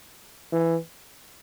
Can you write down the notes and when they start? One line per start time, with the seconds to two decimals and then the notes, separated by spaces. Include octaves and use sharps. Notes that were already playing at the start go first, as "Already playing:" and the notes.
0.53 E3